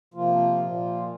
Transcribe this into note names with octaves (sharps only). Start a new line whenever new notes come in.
C3 F3 A#3 F4
A#2 F3 A#3